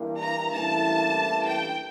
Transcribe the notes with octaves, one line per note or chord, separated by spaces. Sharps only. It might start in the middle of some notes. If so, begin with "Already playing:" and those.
Already playing: G2 E3 A#3
A#5
A1 G2 E3 A#3 E4 A5
G5